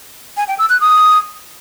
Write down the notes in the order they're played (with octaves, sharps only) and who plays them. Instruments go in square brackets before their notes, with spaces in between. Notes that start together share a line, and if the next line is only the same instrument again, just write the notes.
[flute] G#5
G5
E6
F#6
D#6